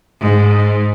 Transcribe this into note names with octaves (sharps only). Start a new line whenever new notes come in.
G#2